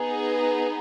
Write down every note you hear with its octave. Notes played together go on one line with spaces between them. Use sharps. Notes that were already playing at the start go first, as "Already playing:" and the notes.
Already playing: B3 D#4 G#4